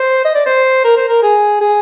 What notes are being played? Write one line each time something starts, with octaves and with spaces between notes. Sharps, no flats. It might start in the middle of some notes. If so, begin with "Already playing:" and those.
Already playing: C5
D#5
D5
C5
A#4
C5
A#4
G#4
G#4